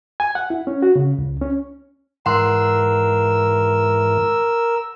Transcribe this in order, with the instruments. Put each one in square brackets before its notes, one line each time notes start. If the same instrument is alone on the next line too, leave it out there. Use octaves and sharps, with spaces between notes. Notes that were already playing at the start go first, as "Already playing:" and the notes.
[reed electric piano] G#5
F#5
E4
C#4
F#4
C#3
C#2
C#4
[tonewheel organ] G#2 E3 [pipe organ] A#4 E6 [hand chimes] F#5 C6